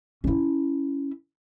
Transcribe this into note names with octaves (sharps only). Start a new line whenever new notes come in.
C#4 E4